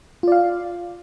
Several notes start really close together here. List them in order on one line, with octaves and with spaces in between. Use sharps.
F4 D5 F5